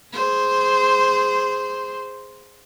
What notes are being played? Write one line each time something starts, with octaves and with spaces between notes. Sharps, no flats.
G#4 C5